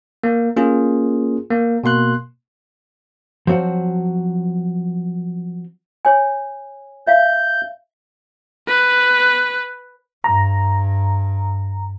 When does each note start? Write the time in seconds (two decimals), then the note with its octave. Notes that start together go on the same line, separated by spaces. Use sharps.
0.24 A#3
0.56 A#3 C#4 F4 G#4
1.51 A#3
1.84 B2 A#3 C6 F#6
3.47 F3 F#3 C4 F#4
6.05 C#5 G#5
7.07 E5 F5 G6
8.67 B4
10.24 G2 A#5